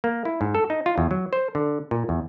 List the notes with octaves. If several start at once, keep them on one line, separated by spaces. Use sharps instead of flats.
A#3
E4
G#2
A4
D#4
F4
E2
F#3
C5
D3
A#2
E2